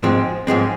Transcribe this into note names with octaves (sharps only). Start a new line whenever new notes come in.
G#2 F3 G#3 C4
G#2 F3 G#3 C4